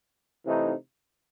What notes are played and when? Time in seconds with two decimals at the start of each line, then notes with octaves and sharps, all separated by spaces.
0.46 C3 E3 A3 D#4